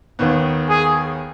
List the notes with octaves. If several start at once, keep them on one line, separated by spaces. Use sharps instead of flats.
D#2 D#3 B3
G#4